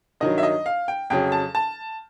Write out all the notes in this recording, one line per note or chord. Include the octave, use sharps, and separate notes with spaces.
G2 D#3 F#3 D#5
E5
D#5
F5
G5
F2 C#3 F#3 G5
A5
A5